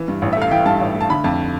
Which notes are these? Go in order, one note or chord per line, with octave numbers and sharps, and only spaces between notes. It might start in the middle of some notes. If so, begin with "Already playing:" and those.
Already playing: E3
G2
A1
E5
A3 F5
E3 G5
G2 A5
A1
A3
A5
D3 B5
F2 A5